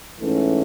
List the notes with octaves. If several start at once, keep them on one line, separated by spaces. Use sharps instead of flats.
G#2 E3 A3 C#4